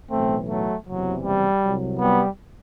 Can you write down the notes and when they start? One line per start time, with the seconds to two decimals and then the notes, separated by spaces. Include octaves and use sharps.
0.10 B1 A2 E3 A3 C4
0.48 F#3 A3
0.86 F#1 E2 C3 E3 F#3
1.24 G3
1.63 C2 C3 F#3
2.00 G3 B3